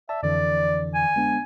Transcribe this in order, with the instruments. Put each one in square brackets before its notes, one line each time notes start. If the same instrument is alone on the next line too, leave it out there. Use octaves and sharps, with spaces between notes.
[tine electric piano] D5 A5 [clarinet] E5
[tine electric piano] F2 D3 E3 [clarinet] D5
[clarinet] G#5
[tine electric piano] G#3 B3 D4